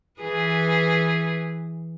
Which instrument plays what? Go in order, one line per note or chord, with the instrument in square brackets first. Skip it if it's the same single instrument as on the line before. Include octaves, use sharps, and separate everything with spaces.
[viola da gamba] E3 G#4 B4